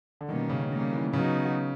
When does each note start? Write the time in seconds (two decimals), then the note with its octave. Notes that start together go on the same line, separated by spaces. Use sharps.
0.21 D3
0.29 B2 D#3 G3 A#3 C#4
0.50 C#3
0.71 G3 A#3 C#4
0.93 E3
1.13 C#3 F#3 B3 D#4 F#4